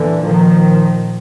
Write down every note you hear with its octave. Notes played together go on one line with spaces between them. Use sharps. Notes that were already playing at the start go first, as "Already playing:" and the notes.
Already playing: A#2 D3 E3
D#3 F3
A#2